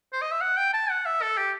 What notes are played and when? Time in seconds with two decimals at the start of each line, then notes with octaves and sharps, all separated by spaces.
0.13 C5
0.22 D#5
0.32 E5
0.41 F#5
0.57 G5
0.73 A5
0.90 F#5
1.06 E5
1.22 A4
1.37 G4